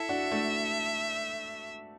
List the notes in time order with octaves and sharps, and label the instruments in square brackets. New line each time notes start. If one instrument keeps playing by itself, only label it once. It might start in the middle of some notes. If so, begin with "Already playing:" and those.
Already playing: [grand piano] E4 A4 [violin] E5
[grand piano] D4 F#4
A3 D4